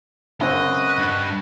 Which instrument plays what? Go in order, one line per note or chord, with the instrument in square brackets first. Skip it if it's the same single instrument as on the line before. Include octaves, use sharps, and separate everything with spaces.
[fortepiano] F#2 C#3 C4 [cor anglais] F#4 [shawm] B4 [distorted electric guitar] D#5
[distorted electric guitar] G2